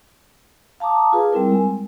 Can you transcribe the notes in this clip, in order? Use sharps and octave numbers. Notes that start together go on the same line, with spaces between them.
F5 A5 A#5 D6 D#6
F4 G#4 B4
G3 C4 E4 A#4
G#3 G#5